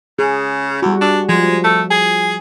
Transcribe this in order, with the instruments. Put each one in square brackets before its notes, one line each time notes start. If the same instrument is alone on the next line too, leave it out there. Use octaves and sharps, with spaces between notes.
[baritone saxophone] C#3 [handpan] G#4
[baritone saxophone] E2 [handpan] G3 F#4
[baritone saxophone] D4
[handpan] F3 [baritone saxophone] G#3
[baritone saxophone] A3
G#4